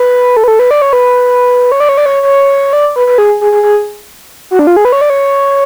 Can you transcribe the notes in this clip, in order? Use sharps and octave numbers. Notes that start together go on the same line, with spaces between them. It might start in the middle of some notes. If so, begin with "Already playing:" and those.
Already playing: B4
A4
B4
A4
B4
D5
C#5
B4
C#5
D5
C#5
D5
C#5
C#5
D5
B4
B4
G#4
G#4
G#4
G#4
F#4
D4
F4
G#4
B4
C#5
D5
C#5